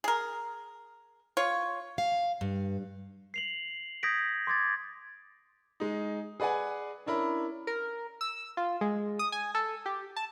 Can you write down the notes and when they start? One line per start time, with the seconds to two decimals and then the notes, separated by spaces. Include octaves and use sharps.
0.04 G#4 A#4
1.37 F4 C#5
1.98 F5
2.41 G2
3.34 C7 F7 F#7
4.03 D#6 G6 G#6 A#6 B6 D7
4.47 C6 D6 G#6 A6
5.80 G#3 D#4
6.40 G#4 B4 D5 F#5 G#5
7.06 C#4 D4 E4 A#4 B5
7.67 A#4
8.21 E6
8.57 F4
8.81 G#3
9.19 D#6
9.32 G#5
9.55 A4
9.86 G4
10.16 A5